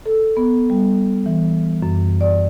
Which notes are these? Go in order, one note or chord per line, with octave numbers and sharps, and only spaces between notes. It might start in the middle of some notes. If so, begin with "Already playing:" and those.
A4
B3
G3
E3
F#2
D5